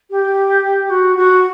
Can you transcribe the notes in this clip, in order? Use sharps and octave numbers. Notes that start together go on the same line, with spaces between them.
G4
F#4
F#4